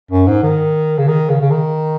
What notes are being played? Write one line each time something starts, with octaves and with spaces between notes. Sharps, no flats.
F#2
G#2
D#3
C#3
D#3
C#3
C#3
D#3